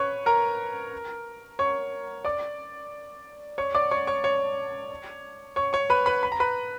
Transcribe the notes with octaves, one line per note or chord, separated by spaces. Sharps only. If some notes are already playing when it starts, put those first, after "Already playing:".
Already playing: B4 C#5 C#6
A#4 A#5
C#5 C#6
D5 D6
C#5 C#6
D5 D6
C#5 C#6
C#5 C#6
C#5 C#6
C#5 C#6
C#5 C#6
B4 B5
B4 B5
B5
A#5
B4 B5